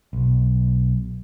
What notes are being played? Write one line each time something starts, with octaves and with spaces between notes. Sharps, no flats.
B1